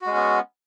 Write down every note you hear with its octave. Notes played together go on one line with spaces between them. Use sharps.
G#3 B3 C#4 F#4